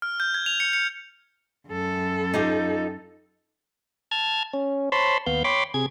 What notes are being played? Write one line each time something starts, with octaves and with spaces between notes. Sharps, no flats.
F6
G6
G#6
F7
C#7
C#7
F#2 A4
D#4 F4 G4
A5 F6 G#6
C#4
C5 C#5 A5 B5 C6
D#2 B3 F5 G6
C#5 G5 B5 C6 D6
C3 G#4 G#6